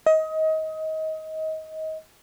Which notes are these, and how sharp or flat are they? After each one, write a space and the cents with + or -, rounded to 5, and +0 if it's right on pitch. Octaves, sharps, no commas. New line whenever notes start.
D#5 +25